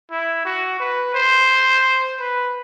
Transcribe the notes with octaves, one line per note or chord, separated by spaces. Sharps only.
E4
F#4
B4
C5
B4